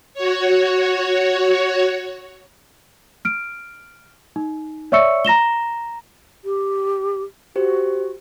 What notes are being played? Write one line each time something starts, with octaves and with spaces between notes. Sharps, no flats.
F#4 C#5
F6 D7
D#4
C#5 D5 E5 C#6 E6 C#7
A#5 A#6 E7 G7
G4
F#4 G4 C5